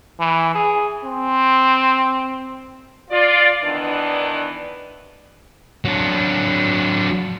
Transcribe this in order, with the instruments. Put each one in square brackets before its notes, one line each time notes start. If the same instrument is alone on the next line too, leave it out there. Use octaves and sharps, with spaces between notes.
[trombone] E3
G#4
C4
[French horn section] F4 D5
D#3 E3 B3 D4
[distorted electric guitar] F#3 D4